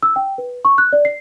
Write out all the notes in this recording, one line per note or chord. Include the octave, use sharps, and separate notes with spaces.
E6
G5
B4
C#6
F#6
D5
C7